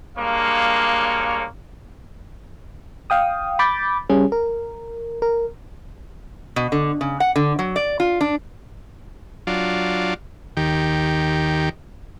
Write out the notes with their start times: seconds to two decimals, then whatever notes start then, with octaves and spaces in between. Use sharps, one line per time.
0.18 G3 G#3 A#3 D4 C#5 F5
3.10 F5 G5 D#6
3.59 B5 D6 G6 A6
4.10 G3 C#4 G#4
4.32 A#4
5.22 A#4
6.56 B2
6.72 D3
7.01 C#3
7.20 F#5
7.36 D3
7.59 F#3
7.76 D5
8.00 F4
8.21 D4
9.47 F#3 D4 F4
10.57 D#2 D#3 G4